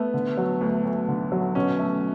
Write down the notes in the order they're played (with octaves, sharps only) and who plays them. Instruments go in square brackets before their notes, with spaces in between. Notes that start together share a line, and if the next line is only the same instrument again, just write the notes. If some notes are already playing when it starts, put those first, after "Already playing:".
Already playing: [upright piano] A3 [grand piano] B3
[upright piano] D3
F#3
D2
D2
D3
F#3
[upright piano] B2 [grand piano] C#4
[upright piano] A3